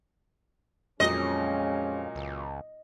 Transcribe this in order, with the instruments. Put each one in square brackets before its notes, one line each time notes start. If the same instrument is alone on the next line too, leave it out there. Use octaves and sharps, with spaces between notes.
[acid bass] F2 [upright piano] A#2 F#3 [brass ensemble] G#3 C#4 [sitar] D#5
[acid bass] C#2